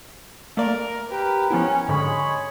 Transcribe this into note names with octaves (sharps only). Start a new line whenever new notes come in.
A3 A#3 A#4 D5
G4 A#4 B4
F3 B3 C#4 E4
G#2 D3 G#3 C#5 B5